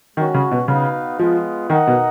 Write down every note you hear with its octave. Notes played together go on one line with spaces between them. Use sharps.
D#3 G#3 C#4 F#4 C#5
C#3
B2
C#3 B3 D#4 F#4 B4 F5
F3 G#3 B3 F4
D#3 D#4 A#4 D#5 F#5
B2